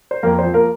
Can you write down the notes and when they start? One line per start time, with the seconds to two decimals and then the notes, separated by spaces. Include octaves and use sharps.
0.11 C5
0.23 F2 A#3 A#4
0.38 F3 C4 C5
0.54 A#3 A#4